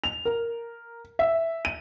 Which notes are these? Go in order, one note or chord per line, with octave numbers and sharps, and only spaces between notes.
F7
A#4
E5
D#7